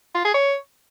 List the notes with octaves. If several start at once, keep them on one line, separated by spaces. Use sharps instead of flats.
F4
G#4
C#5